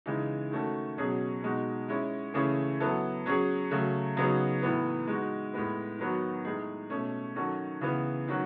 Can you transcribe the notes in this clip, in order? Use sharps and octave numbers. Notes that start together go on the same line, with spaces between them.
C#3 E3 G#3 D#4
D#3 A3 C#4 F#4 A4
B2 F#3 C#4 G#4
B2 G#3 D#4 F#4
G#3 C#4 E4
C#3 E3 A3 C#4 G#4
F#3 B3 E4 A4
F#3 C#4 G#4
C#3 F#3 A3
C#3 F#3 B3 D#4 G#4
A2 E3 B3
G#3 D#4 F#4
A2 G#3 B3
D#3 F#3 B3 F#4
A2 G#3 D#4 G#4
B2 A3 C#4
D#3 F#3 C#4 F#4 A4
C#3 E3 B3
D#3 F#3 C#4 F#4